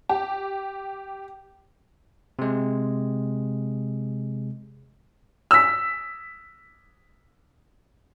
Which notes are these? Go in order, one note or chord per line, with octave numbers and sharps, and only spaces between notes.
G4
C3 G#3
E6 B6